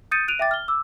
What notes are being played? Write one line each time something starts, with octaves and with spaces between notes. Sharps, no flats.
D#6 G6 A6 C#7 D#7
F#6 D7 D#7 F7
E5 G5 D6 A6
F6 G7
D6 E6